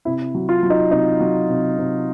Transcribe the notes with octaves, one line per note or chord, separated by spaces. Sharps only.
C3 E4
F#3
F4
F#3
D#4
C3 D#4
F#3
C3
C3